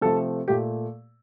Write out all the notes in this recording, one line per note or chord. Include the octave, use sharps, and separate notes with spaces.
C3 F3 A3 A4
A#2 A3 G4